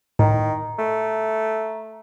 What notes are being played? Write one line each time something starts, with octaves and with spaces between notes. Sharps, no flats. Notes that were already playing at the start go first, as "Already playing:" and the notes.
A2 D#3 A#5
A3